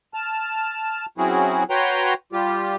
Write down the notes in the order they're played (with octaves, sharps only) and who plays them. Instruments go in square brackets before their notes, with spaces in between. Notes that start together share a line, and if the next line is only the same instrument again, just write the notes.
[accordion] A5 F6
F#3 C4 C#4 E4 F#4 G#4
F#4 B4 C#5 G5 A#5 C6
G3 F4 G4